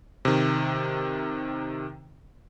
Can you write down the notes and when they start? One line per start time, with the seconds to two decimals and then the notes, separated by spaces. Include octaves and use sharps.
0.25 C3 D#3